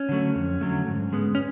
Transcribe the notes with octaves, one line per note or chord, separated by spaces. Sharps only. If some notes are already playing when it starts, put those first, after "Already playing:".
Already playing: C#4
D3 F#3 A3
F2
D3 F#3 A3
G#2
G#3 B3
C#4